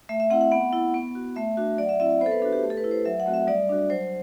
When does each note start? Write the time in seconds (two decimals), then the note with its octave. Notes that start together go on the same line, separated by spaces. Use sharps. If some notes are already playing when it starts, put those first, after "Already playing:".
0.09 A3 E5
0.20 E5
0.30 C4 E4 F#5
0.41 F#5
0.51 B3 F#5
0.73 E4
0.94 B3
1.15 F#4
1.36 A3 E5
1.57 D4 F#4
1.78 F#3 D5 F#5
1.89 E5
2.00 C4 E4 E5
2.10 E5
2.21 B3 C5
2.26 A4
2.31 B4
2.42 D4 A4
2.45 F#4
2.53 G4
2.63 A3
2.70 A4
2.77 B4
2.84 E4
2.91 C5
3.05 F#3 E5
3.20 F#5
3.26 A3 C4 F#4
3.34 E5
3.47 G3 D5
3.69 D4 F#4
3.90 F#3 C5